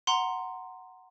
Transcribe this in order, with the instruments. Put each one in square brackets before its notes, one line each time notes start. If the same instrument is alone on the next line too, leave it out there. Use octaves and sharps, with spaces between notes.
[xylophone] F#5 A#5 C6